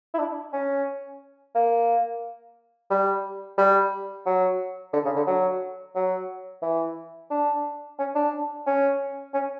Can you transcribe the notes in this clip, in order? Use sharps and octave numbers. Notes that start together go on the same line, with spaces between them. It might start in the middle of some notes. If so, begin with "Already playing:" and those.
E4
D4
C#4
A#3
G3
G3
F#3
D3
C#3
D3
F#3
F#3
E3
D4
C#4
D4
C#4
C#4